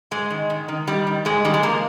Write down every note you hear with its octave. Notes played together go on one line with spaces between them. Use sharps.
G#2 G#3
D#3
D#3
D#3
D#3 G3
D#3
G#2 G#3
D#3 G3
G#3
F3 A#3